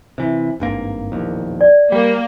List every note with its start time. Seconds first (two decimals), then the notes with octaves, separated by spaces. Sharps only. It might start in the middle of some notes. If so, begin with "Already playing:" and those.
0.18 C3 E3
0.60 G#1 G2 A#3
1.12 E1 A#1 D#2
1.61 D5
1.92 G3 A#3